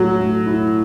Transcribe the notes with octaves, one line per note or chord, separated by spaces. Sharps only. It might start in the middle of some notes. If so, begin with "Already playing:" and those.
Already playing: A2 F#3 A3
A3
E4